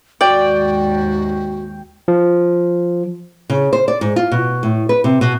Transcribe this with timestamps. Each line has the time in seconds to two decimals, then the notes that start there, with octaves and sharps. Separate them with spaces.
0.21 D#2 G#2 F#4 D5 G5
2.08 F3
3.50 C#3
3.73 C5
3.88 D5
4.01 G#2
4.16 F4
4.31 B2
4.63 A2
4.89 B4
5.04 C3
5.21 B2